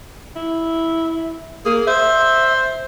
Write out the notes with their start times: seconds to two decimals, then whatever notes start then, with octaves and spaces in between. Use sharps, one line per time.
0.36 E4
1.65 A#3 G#4
1.87 C5 E5